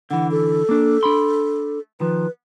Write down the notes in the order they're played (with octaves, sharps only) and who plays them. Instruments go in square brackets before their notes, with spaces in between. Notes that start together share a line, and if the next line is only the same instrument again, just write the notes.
[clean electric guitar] D3 E3 [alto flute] F#5
[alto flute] A4
[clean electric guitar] A#3 D4
D4 B5 C6
[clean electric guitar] D#3 F3 [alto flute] B4